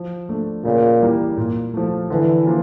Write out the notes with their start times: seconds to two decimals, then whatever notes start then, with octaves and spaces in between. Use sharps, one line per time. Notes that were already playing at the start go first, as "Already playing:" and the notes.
Already playing: F3
0.29 A3 D4
0.65 A#2 C#3
1.01 E3 G3 A#3
1.37 A#2
1.74 F3 A3
2.10 D3 E3
2.46 F3 A#3 D4 F4